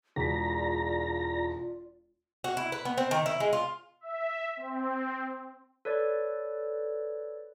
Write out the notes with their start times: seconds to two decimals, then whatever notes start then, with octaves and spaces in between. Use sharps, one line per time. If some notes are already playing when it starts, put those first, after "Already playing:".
0.16 E1 F4 G#4 D5 A#5 B6
2.44 F#4
2.57 E4
2.72 B4
2.85 B3
2.98 C4
3.11 D#3
3.26 E4
3.40 G#3
3.53 F4
4.01 E5
4.57 C4
5.85 A4 B4 C#5 D5